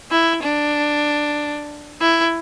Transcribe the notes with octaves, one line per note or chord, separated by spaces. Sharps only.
E4
D4
E4